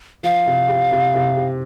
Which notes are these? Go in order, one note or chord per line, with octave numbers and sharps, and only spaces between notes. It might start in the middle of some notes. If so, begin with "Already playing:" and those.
F3 F5
C3
G4
C3
C3
G4